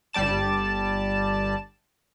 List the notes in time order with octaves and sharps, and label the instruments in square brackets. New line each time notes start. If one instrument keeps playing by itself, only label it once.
[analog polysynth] G1 G3 D5 A5 E7